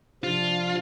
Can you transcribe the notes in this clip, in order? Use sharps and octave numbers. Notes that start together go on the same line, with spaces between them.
C3 F3 D4 F4